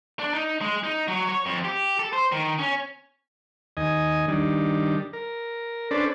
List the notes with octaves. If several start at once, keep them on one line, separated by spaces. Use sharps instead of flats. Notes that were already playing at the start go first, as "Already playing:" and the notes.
D4
D#4
G#3
D#4
F#3
C#5
F2
G4
A4
C5
D#3
C#4
D#2 D#5 G#5
D#3 G3 D4
A#4
C#4 D4 A4 B4 C5 D5